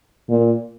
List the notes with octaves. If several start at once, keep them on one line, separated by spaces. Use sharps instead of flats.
A#2